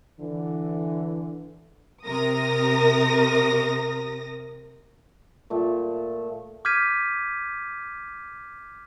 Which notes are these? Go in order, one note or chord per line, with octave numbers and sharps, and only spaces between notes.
D3 E3
C3 A#4 D#6 A#6
A#2 A3 G5
D6 F6 G6 G#6 B6 D#7